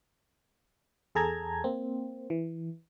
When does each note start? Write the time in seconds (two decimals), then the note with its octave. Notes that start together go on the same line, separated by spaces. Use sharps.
1.15 E2 G#4 A4 A5 A#5 G#6
1.64 A#3 C4
2.30 E3